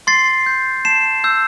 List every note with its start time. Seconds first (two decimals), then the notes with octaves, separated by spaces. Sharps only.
0.07 C6 A6 C7
0.46 G6
0.85 A5 C7 E7
1.24 E6 G6